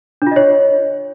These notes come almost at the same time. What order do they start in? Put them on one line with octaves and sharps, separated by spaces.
D4 F4 D#5 C#5